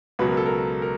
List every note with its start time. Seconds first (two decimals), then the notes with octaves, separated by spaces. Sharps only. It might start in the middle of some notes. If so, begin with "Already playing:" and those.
0.19 C#2 B2 F#3 B4
0.28 A#4
0.37 A4
0.46 A#4
0.82 A#4